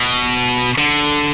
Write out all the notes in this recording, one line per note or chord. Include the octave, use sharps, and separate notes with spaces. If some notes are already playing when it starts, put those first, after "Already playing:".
Already playing: B2
D3